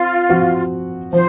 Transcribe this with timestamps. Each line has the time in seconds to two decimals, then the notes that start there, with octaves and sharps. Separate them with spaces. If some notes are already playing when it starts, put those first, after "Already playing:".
Already playing: C4 F4
0.29 F3 C4 F#4
1.13 F3 C5